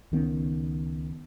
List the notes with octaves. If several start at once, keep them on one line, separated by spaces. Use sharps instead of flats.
C#2 D#3 B3 C#4